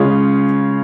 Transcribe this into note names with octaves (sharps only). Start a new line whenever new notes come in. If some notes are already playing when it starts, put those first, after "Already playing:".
Already playing: C#3 G#3 C#4 F4